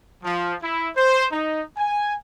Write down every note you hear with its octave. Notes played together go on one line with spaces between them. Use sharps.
F3
E4
C5
D#4
G#5